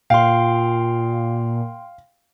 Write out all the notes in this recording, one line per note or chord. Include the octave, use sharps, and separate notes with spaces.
A#2 F5 G5 C6